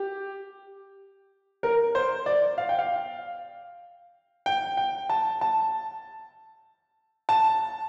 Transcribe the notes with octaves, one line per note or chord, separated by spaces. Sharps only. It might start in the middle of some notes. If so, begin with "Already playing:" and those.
Already playing: G4
A#4
C5
D5
F5
G5
F5
G5
G5
A5
A5
A5